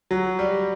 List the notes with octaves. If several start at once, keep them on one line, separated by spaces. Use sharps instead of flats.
F#3
G3